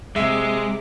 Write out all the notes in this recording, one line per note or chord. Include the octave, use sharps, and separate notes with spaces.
C3 G#3 E5 D6